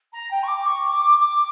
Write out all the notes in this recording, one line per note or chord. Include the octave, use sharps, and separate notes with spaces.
A#5
G5
C#6
D6
C#6
D6
D6